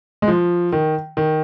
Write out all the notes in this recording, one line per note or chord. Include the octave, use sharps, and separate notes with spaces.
G#3
F3
D#3
D#3